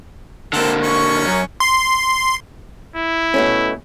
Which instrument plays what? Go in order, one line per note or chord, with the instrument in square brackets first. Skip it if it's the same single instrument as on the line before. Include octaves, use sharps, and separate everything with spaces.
[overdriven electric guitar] D3 A#3 [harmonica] C4 A4
[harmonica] C#4 C#6
[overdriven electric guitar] F#2
[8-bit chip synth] C6
[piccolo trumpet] E4
[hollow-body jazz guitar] B2 A3 C#4